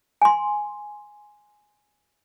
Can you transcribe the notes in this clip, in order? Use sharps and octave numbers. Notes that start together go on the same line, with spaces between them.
G#5 C6